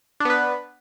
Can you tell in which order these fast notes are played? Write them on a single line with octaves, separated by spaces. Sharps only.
D4 B3 B4